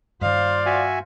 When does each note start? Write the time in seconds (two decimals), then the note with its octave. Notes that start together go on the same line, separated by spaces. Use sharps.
0.21 G2 D#3 F4 C5 D5 F5
0.66 F#4 E5 G#5